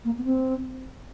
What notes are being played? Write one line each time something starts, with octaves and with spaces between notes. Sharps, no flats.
A#3
B3
C4